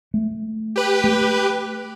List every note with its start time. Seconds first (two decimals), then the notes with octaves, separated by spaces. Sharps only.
0.14 A3
0.76 G4 B4
1.04 A3